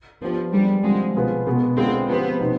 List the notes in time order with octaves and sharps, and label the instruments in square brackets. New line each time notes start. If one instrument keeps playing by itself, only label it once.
[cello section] F3 [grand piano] B3 D4 G4
[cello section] G3 [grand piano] G#3 B3 D4
[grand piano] D3 F3 C4 G4 C5 [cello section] G#3
[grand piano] B2 B3 F4 G#4 B4
B2 G#3 B3
[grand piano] D3 G#3 B3 F4 [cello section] C4
[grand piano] F3 C4 G4 C5 [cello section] B3
[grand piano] B2 B3 D#4